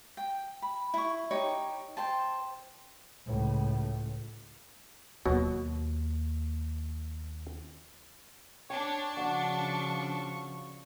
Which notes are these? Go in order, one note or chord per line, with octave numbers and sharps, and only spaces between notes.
G5
B5
E4 C#6
D#4 G4 C#5 C#6
C5 G5 A5
C#2 A2
D#2 B2 F#3
D4 C#5 G5
C#3 F3 F#4 D5 F#5 C#6